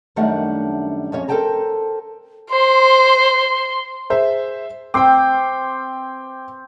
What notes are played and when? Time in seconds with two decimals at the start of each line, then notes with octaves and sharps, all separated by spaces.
0.16 F#2 D#3 G3 A3 D4 F#5
1.12 F2 C#4 C#5
1.28 A4 A#4 C5 G5 A5 A#5
2.50 C5 C6
4.10 G#4 C5 E5
4.94 C4 C5 G5 D6